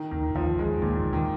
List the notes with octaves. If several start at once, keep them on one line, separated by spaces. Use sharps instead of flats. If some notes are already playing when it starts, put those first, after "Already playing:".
Already playing: D#3
D#2 D#3
D#2 F3
D#2 G#3
D#2 A#2
D#2
D#3